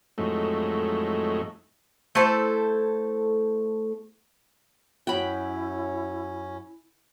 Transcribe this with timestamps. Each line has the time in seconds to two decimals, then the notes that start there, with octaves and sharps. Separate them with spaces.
0.18 F2 A2 F#3 G#3 A3 D#4
2.15 A3 E4 A4 C5
5.07 F#2 C#4 E4 F#4 F#5 G5 B5